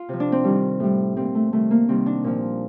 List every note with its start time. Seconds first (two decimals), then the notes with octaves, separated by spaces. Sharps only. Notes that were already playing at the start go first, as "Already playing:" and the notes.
Already playing: F4
0.09 C3 F3
0.20 D4
0.32 C4
0.44 C3 D#3 G3
0.80 A2 G3
1.16 A#2 G3 C4
1.35 A3
1.52 C3 D#3 G3 A3
1.71 A#3
1.88 C3 D#3 G3 C4
2.06 D4
2.24 A#2 F3